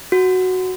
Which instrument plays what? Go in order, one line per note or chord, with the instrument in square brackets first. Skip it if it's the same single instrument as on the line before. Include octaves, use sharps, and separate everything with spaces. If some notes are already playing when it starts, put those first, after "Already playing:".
[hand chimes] F#4